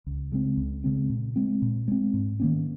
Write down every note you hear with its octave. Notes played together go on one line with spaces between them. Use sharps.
C#2
C#3 G#3 C4
C#2
C#3 G#3 C4
A#2
G#3 C4
A#2
G#3 C4
G#2
D#3 A#3 C#4